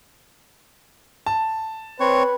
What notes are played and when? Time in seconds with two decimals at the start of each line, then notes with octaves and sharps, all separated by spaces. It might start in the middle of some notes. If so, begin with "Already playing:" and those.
1.26 A5
2.00 C4 B4 C#5